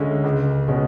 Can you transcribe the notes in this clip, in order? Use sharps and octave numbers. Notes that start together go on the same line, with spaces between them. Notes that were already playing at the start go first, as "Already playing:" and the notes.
Already playing: D2 D3 G#3 C#4
C#2
B2 G#3 C#4